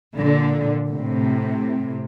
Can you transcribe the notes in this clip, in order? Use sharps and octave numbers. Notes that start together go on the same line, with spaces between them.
A#2 D3
A2 C3